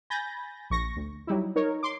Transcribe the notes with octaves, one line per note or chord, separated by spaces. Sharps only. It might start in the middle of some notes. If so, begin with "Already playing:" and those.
G#5 B5 G6 A6 A#6
A#1 C#6 A#6
D2
F#3 G3 D#4 E4
D#4 A#4 C#5
C6 D6